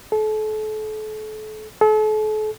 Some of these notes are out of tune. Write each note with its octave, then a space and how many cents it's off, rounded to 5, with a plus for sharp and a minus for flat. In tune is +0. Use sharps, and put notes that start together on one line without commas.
A4 -35
A4 -40